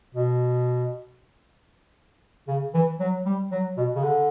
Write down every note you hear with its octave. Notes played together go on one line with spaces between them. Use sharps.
B2
C#3
E3
F#3
G3
F#3
B2
C#3
D3